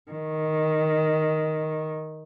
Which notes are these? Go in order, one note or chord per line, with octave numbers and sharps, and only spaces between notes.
D#3